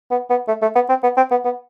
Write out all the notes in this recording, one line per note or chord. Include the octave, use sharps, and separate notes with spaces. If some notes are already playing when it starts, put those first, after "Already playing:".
B3
B3
A3
A3
B3
C4
B3
C4
B3
B3